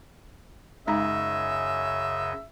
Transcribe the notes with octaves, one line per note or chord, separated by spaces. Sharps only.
F#2 C#3 G#3 D#4 D#5 E5 A#5